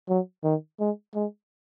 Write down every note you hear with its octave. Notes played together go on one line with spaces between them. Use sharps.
F#3
D#3
G#3
G#3